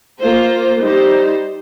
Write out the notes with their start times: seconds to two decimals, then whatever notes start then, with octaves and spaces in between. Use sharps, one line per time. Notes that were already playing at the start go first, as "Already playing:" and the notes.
0.21 A#3 F4 C5
0.81 G3 D#4 C5